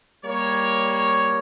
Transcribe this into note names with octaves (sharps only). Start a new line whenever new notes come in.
G3 A#3 C#5